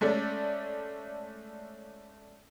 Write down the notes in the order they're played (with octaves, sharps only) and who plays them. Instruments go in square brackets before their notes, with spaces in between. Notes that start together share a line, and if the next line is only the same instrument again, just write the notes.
[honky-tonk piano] G#3 A3 C#4 A4 D5